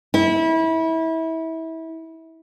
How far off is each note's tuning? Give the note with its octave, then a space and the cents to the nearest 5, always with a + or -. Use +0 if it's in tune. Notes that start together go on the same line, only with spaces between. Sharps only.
E4 -25